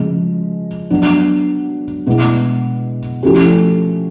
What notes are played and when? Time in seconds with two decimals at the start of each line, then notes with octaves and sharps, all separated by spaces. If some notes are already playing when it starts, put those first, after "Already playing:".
Already playing: C#3 F3 G#3
0.90 F#3 B3 D4
2.06 B2 G#3 B3 E4
3.23 F3 A3 C#4 E4 G4